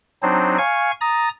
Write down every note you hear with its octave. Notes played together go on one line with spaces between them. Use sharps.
F#3 C4 D4 D#4 C5
F5 G#5 C#6
A#5 D#6 A6